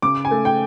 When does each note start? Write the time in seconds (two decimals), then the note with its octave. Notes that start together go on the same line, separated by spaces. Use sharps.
0.02 C#3 D6
0.25 G#5
0.31 A3
0.45 G5